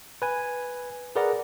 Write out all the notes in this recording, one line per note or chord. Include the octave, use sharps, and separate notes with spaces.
B4 G#5
G#4 A#4 B4 D5 F#5 A#5